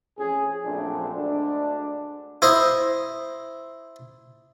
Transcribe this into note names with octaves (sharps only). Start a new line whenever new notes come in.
A1 F2 C#4 G#4
A#1 F#2 A#2 A3 C4 D4
D2 D3 G#3 D4
E4 C5 D#5